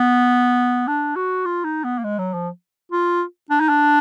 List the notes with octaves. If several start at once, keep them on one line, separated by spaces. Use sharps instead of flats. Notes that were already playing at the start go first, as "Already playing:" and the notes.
Already playing: B3
D4
F#4
F4
D#4
B3
A#3
G#3
F#3
F3
F4
D4
D#4
D4